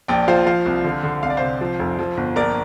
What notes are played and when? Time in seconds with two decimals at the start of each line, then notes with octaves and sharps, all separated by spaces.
0.08 A#1 D5 G5
0.28 F3 C5 F5
0.46 F3 C5 F5
0.66 C2
0.84 D3
1.03 D3
1.23 C2 F5
1.30 D5
1.37 C3 C5 F5
1.61 F3
1.79 F1
1.99 F3
2.17 G1
2.36 A#1 A#4 D5